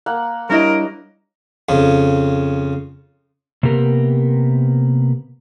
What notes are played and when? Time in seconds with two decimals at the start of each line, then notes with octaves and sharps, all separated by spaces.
0.06 A#3 F#5
0.50 G3 D4 E4 A#4 C#5 D#5
1.69 F2 C#3
3.63 C3 A#3 B3 G4 A#4